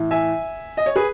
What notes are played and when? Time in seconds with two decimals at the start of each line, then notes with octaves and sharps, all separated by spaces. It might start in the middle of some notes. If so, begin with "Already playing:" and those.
Already playing: A2 E3
0.11 E5 G#5
0.77 D#5
0.86 C#5
0.96 G#4 B4